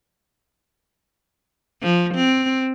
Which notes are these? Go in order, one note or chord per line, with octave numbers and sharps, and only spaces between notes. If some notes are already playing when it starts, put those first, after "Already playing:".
F3
C4